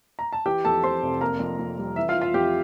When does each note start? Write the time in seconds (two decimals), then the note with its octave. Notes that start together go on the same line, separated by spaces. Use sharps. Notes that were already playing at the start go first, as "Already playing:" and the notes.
0.19 A#5
0.33 A5
0.46 E3 G4 G5
0.65 F2 A4 A5
0.84 F2 C5 C6
1.02 F1
1.21 A#3 A#4 A#5
1.40 F2
1.59 F2
1.78 G3
1.96 E3 E5
2.09 F4 F5
2.15 E3
2.21 F4 F5
2.34 F2 G4 G5